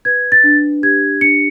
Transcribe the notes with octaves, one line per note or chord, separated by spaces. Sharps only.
B4 G#6
A6
D4
G4 G#6
D4 C#7